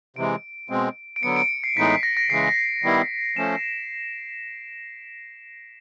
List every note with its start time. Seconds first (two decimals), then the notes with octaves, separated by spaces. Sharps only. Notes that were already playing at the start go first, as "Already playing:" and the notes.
0.16 C3 E3 G#3 D7
0.69 B2 G#3 C4
1.16 D7
1.23 D3 F#3 B3 C#7
1.36 D7
1.64 C7
1.76 A2 E3 G#3 B3 D#4 B6
1.90 B6
2.03 A#6
2.17 A#6
2.30 C#3 E3 G#3 C7
2.83 D#3 G3 B3 E4
3.37 F3 A3 C#4 E7